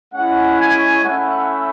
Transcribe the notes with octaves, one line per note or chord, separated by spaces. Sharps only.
G#3 C#4 E4 F#5
G#5
A3 C#4 E4 F#5